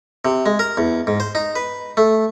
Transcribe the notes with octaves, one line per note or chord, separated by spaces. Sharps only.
C3
G#3
A#4
E2
G#2
C5
D#4
B4
A3